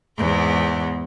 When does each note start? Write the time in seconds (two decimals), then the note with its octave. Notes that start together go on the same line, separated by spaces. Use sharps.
0.18 E2 G#2 B3